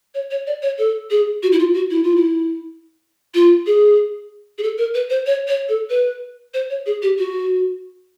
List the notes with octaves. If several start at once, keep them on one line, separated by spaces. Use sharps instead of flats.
C#5
C#5
D5
C#5
A4
G#4
F#4
E4
F4
F#4
E4
F4
E4
F4
G#4
G#4
A4
A#4
B4
C5
C#5
C#5
A4
B4
C5
C#5
G#4
G4
F#4